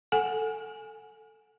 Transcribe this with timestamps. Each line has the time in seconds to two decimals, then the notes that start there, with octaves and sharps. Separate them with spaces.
0.12 A4 F#5 G#5